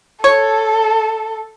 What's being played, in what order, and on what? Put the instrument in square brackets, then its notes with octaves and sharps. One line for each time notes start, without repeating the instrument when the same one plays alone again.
[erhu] A4 [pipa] C#5